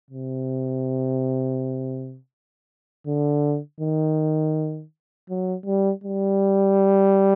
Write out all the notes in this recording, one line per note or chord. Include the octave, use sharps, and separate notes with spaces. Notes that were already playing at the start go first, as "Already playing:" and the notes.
C3
D3
D#3
F#3
G3
G3